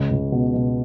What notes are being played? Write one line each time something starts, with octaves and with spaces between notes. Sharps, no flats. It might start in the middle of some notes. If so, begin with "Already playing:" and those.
Already playing: C#2
C#2
B2
B2